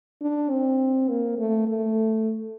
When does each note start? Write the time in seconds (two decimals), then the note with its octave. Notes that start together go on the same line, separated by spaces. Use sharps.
0.21 D4
0.51 C4
1.09 A#3
1.38 A3
1.68 A3